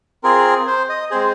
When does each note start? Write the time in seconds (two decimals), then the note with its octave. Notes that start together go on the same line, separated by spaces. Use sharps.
0.23 C4 F4 G#4 A#4
0.67 C5
0.89 D#5
1.11 G#3 C4 G#4 C5